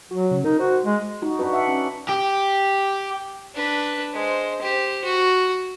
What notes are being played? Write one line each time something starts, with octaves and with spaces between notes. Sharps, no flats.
F#3 F#4
C#3
D#4 A#4
F#4 C5
G#3
D#4 F#4
D4 F#4 B4
E5 F#5
C#4 D4
G4
D4 B4
G#3 C5
G4 C5
F#4